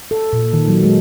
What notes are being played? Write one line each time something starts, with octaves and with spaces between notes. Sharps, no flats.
A4
A#2
D#3
F#3
G#3